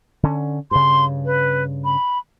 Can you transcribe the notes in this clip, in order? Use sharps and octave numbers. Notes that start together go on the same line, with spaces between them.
D3 C#4
G2 C#3 C6
B4
B5